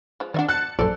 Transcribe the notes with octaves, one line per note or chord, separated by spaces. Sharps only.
F3 G#3
D#3 D4 D5 E5 F#5
A5 F#6 A6 C#7
A#1 F#2 A4 C5 D5